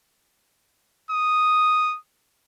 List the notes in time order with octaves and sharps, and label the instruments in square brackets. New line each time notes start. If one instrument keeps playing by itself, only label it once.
[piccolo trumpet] D#6